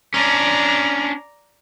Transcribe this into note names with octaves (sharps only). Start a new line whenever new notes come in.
C#4 D4 D5 A#5